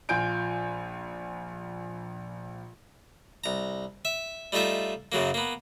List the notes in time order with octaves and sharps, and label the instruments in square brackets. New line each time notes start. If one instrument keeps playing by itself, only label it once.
[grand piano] A#1 F4 G#5 G6 D7
[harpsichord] C2 A#5
E5
G3 A3 D#4 F4 E5
F#2 C#3 F#3 A#3
A#3 B3